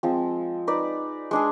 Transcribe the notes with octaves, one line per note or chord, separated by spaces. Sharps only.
F3 G#3 C4
D#4 B4 D5
G#3 D4 G#4